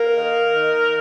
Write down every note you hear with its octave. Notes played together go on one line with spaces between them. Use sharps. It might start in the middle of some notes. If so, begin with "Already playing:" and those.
Already playing: A#3 A#4
D#3
D#3